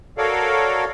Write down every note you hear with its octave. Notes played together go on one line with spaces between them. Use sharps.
F#4 A4 A#4 C#5 D5 F5